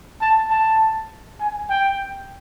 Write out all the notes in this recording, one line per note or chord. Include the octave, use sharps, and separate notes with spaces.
A5
A5
G#5
G5